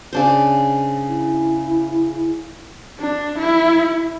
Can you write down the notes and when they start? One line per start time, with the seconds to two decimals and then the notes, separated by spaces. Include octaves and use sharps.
0.13 C#3 D4 C5
1.09 E4
3.00 D4
3.39 E4